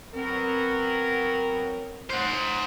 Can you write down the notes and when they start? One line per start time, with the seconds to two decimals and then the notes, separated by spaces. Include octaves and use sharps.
0.14 F#3 B3 C4 A#4
2.10 C5 F#5